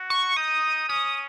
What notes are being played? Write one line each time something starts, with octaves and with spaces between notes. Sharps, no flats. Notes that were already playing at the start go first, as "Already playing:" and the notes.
Already playing: F#4
C#6
D#4 D#6
C#4 D#6